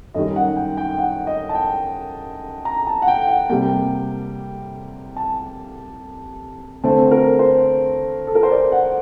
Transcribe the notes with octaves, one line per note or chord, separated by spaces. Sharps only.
F#2 D#3 G3 D#5
F#5
G5
G5
F#5
D#5
A5
G5
A#5
A5
F#5
G5
F#5
C3 G3 A#3 G5
A5
D3 A3 C4 A5
A#4
C5
A4
A#4
C5
D5
F#5